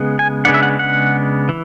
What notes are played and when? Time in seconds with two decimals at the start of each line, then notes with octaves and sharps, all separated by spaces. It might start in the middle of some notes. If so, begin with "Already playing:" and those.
Already playing: C#3 G#3 B3
0.19 G#5
0.45 C#3 G#3 B3 D4 F#5
0.54 E5
0.62 F#5
0.79 F#5
1.49 E3